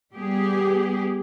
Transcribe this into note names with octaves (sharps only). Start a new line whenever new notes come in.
G3 B3 G4 G#4